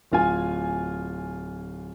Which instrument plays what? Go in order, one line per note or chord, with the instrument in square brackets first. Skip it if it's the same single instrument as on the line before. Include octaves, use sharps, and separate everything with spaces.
[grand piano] D1 F4 G#5